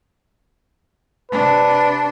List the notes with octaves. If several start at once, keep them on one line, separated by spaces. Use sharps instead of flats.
C3 D4 B4